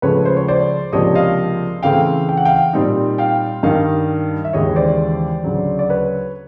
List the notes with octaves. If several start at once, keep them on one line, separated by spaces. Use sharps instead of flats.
C#2 C#3 F3 A3 B4 C#5
C5
C#5
C5 D5
C#2 C3 F3 A#3 D4 C#5 D#5
D#5 F5
C#3 E3 A3 C4 F5 G5
G5
F#5
F5 G5
A#2 G3 C4 D#4
F5 G5
G2 D#3 G3 D#5 F5
E5
D#2 C#3 E3 G#3 C#5 D#5
C5 D5
D2 C#3 F#3
D5
B4 C#5